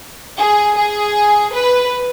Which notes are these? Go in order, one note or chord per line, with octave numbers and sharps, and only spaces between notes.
G#4
G#4
B4